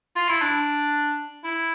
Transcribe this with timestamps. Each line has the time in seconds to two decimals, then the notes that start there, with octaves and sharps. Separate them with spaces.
0.16 F4
0.29 E4
0.42 D4
1.44 E4